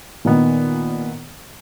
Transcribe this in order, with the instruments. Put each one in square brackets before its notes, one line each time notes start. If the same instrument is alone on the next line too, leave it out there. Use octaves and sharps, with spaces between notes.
[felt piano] A#2 D#3 B3